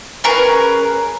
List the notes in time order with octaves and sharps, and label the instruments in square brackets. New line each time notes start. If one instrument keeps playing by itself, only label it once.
[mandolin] C#4 G#4 A#4 B4